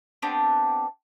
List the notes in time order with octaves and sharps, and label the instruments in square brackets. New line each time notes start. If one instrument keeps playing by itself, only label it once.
[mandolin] B3 C4 D4 G4